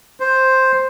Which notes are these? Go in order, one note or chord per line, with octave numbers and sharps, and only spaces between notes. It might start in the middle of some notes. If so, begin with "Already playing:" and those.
C5